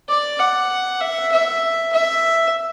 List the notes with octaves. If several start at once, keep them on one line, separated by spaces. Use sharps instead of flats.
D5
F#5
E5
E5
E5